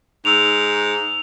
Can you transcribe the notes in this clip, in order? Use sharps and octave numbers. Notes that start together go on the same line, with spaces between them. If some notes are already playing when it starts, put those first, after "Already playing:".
G#2 E6 F7